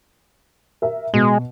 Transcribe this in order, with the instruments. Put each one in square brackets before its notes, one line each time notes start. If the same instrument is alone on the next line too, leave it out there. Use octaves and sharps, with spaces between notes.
[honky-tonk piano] A#4 E5
[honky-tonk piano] B2 [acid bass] G#3